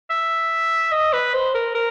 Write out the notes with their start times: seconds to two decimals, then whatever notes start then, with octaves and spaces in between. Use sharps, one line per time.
0.10 E5
0.92 D#5
1.13 B4
1.34 C5
1.54 A#4
1.75 A#4